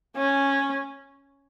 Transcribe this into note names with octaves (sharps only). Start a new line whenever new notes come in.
C#4